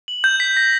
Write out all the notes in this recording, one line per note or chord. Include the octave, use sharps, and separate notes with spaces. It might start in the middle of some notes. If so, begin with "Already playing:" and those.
F#7
G6
B6
A#6